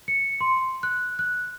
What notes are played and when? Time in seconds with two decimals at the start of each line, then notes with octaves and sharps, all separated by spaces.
0.08 C#7
0.41 C6
0.83 F#6
1.19 F#6